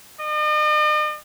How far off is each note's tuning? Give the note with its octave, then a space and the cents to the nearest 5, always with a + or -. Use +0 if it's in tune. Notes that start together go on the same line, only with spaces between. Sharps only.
D#5 -45